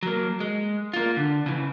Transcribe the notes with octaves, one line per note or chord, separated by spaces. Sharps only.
F#3 A#3
G#3
A#3 F4
D3
C#3 E3